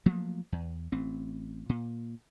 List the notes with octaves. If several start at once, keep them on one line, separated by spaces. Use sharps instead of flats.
F3 F#3 A3 A#3
E2
A1 C4
A#2